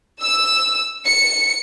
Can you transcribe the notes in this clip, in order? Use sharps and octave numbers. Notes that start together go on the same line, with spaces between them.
E6
C#7